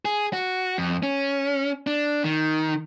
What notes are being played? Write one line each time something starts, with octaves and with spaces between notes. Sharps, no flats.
G#4
F#4
F2
C#4
D4
D#3